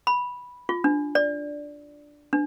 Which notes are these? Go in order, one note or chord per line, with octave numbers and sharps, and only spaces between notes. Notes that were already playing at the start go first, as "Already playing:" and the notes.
B5
F4
D4
D5
D4